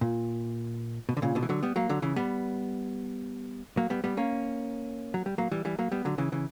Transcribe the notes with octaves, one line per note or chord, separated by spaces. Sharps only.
A#2
B2
D3
A#2 C#3
B2 D3
E3
D3 F#3
G3 B3
F#3 A#3
D3 F#3
C#3 E3
G3 B3
F#3 A#3
G3 B3
G3 B3
A#3 C#4
F#3
G3
F#3 A#3
E3 G3
E3 G3
F#3 A#3
G3 B3
D3 F#3
C#3 E3
C#3 E3